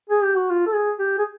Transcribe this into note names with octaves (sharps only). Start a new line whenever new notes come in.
G#4
G4
F#4
F4
A4
G#4
G4
G#4